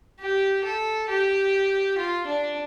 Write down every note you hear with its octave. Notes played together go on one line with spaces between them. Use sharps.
G4
A4
G4
F4
D4